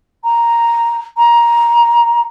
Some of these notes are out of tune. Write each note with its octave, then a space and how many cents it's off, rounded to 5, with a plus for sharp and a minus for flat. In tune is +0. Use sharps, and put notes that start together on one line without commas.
A#5 +0
A#5 +15